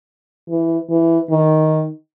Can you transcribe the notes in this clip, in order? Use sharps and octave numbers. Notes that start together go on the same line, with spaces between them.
E3
E3
D#3